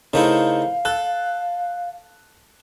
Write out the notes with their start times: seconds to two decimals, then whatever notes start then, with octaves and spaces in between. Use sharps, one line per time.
0.14 C#3 A3 D#4 E4 A#4 C5 F5
0.85 A4 F#6